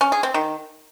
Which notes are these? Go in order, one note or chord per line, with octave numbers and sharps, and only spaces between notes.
C#4
G#4
C4
D#3